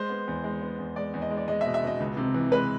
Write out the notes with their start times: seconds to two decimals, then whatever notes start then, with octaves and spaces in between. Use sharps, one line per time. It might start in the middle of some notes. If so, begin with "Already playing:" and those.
Already playing: G#3 C5
0.10 B3
0.28 E2
0.44 G#3
0.62 B3
0.78 E2
0.96 G#3 D5
1.14 E2
1.22 D#5
1.30 G#3
1.37 D5
1.48 G#3 D#5
1.61 E5
1.66 B2
1.74 E5
1.83 B2 D#5
2.00 C#2
2.17 C3
2.34 E3
2.52 G#3 B4